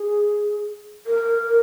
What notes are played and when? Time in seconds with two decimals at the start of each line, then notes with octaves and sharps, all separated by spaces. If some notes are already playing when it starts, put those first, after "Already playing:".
Already playing: G#4
1.06 A#4